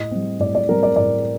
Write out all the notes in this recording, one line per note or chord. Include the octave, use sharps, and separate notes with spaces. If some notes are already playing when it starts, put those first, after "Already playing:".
Already playing: A2 D#5
G3 C4
A2 D5
D5
G3 C4 A#4
D5
A2 D5